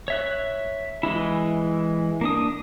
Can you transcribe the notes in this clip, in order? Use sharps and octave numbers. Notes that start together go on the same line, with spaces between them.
C#5 E5 F#6
E3 G#3 E4
A#3 D4 D#6